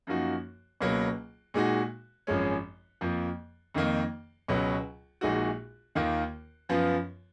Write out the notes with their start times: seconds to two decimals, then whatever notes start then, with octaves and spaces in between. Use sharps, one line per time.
0.07 F#2 F3 A#3 D#4 F#4
0.81 C#2 B2 F#3 A#3
1.54 A#2 G#3 D#4 F#4
2.27 G#1 F#2 F3 G#3 C#4
3.01 F2 F3 A#3
3.74 F2 D#3 A#3 D#4
4.48 C#2 B2 F#3
5.21 A#1 A#2 G#3 D#4 F#4
5.95 D#2 D#3 A#3 F4
6.69 F#2 F3 B3 F4